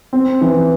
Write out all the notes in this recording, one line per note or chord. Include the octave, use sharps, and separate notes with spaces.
C4
E3